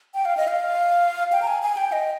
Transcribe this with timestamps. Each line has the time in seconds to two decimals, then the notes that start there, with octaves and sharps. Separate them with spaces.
0.14 G5
0.25 F5
0.37 D#5
0.48 F5
1.32 G5
1.42 A#5
1.47 G#5
1.62 G#5
1.77 G5
1.92 D#5